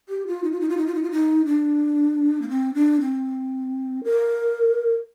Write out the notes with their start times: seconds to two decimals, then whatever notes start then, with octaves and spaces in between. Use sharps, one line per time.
0.09 G4
0.27 F4
0.44 D#4
0.52 F4
0.61 D#4
0.69 F4
0.77 D#4
0.87 F4
0.94 D#4
1.03 F4
1.11 D#4
1.46 D4
2.42 A#3
2.49 C4
2.74 D4
3.01 C4
4.04 A#4